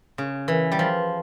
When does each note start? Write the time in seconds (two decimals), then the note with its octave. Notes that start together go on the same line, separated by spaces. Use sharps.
0.18 C#3
0.48 E3
0.72 G3
0.79 F3